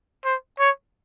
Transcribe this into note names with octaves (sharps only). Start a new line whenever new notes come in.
C5
C#5